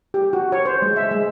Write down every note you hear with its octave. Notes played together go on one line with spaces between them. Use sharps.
G4
F#4
C#5
C5
G#3
E5
G#3